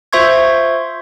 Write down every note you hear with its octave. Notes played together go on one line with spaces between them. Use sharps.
F4 C5 E5 C6 C#6 G#6